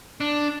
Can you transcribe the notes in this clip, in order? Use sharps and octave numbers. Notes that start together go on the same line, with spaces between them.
D4